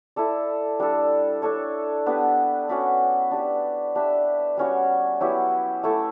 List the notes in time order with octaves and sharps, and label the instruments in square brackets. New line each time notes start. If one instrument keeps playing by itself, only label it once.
[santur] E4 A4 D5
G3 D4 A4
D4 A4 C#5
B3 D4 G4 B4
C#4 F#4 B4 D5
D4 G4 B4
D4 G4 B4 E5
G3 C#4 F#4 C#5
F#3 B3 E4 G4
A3 E4 A4